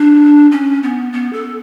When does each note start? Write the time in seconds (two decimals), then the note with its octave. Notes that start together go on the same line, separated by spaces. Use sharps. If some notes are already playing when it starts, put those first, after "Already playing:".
Already playing: D4
0.52 C#4
0.83 B3
1.13 B3
1.33 A4